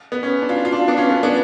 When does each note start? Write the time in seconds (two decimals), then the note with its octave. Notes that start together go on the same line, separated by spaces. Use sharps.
0.12 B3
0.23 C#4
0.42 D4
0.49 F4
0.57 D4
0.65 F4
0.72 D4
0.80 F4
0.88 B3 D4
0.97 C#4 F4
1.09 B3
1.23 B3 D4